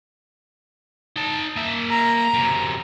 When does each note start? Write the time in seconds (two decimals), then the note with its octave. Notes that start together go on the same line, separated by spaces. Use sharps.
1.16 D#4 A5
1.56 A#3 E5
1.91 A#5
2.34 F#2 C3